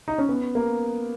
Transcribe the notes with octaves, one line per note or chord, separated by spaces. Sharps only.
D#4
C#4
B3
A#3